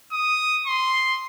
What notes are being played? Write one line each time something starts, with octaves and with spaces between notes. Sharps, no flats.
D#6
C6